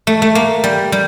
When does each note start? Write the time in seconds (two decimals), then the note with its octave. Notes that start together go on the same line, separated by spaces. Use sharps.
0.07 A3
0.22 A3
0.35 A#3
0.64 G3
0.92 G3